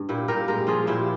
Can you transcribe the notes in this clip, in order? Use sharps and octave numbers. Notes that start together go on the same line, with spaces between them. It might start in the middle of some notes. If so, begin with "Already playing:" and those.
Already playing: G2
A#2 E4 G4
A#2 G4 A#4
G#3 G4 A#4
F3 F4 G#4
A#2 E4 G4